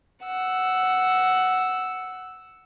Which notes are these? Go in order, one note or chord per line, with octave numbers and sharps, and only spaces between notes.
F#5 E6